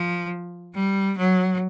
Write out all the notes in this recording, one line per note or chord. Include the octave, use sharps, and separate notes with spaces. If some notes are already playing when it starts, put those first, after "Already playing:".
Already playing: F3
G3
F#3